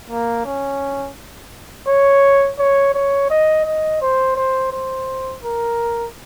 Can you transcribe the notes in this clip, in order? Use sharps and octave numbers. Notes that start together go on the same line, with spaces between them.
A#3
C#4
C#5
C#5
C#5
D#5
D#5
C5
C5
C5
A#4